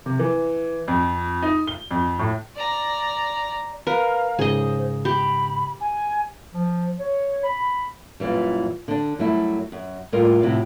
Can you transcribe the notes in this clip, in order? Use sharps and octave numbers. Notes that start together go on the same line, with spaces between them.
C3
E3
F2
D#4
G7
F2
A2
D5 A#5
A#4 B4 F5
G#2 C#3 G#4 C5 D#5
G4 B5
G#5
F3
C#5
B5
F#2 A#2 C#3 E3 G3
D3 D4
F#2 F#3 G3 A3 E4
F#2
A2 G3 F4 A4 A#4
A2 C3 F3 E4 F#4 G4